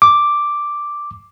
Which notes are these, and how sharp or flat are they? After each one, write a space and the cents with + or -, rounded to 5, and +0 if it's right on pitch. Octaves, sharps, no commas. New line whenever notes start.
D6 +0